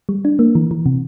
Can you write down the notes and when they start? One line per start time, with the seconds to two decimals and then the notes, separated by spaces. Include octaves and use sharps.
0.09 G3
0.25 D4
0.39 A#3
0.55 E3
0.71 E3
0.86 C3